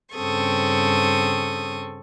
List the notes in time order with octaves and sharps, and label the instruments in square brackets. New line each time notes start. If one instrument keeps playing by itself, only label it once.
[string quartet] G2 C#3 C4 A4 C#6 D#6